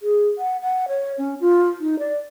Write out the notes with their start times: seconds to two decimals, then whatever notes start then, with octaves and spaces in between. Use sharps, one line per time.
0.01 G#4
0.38 F#5
0.62 F#5
0.88 C#5
1.18 C#4
1.41 F4
1.80 D#4
1.99 D5